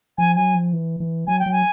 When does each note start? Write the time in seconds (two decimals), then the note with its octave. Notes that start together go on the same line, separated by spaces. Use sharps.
0.18 F3 G#5
0.36 F#3 G#5
0.54 F3
0.73 E3
1.00 E3
1.27 F#3 G#5
1.39 G5
1.46 F#3
1.52 G#5